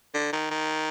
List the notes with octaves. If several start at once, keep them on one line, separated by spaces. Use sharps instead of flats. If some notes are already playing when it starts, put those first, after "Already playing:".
D3
D#3
D#3